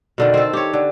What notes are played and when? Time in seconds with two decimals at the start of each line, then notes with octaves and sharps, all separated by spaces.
0.18 B2 D3 D#3
0.34 C4 A4
0.53 G4 C#5
0.73 D3